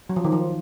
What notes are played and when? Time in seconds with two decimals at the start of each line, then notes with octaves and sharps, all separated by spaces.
0.09 F#3
0.16 F3
0.24 D#3
0.32 F3